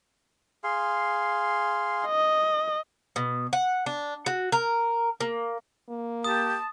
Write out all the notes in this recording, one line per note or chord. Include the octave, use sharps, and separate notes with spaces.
G#4 F5 C6
D#5
B2
F#5
D4
F#4
A#4
A#3
A#3
G4 A5 D#6